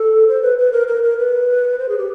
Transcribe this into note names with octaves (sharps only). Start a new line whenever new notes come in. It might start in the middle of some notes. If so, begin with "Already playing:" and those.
Already playing: A4
C5
B4
B4
A#4
A#4
A#4
B4
C5
G#4
G4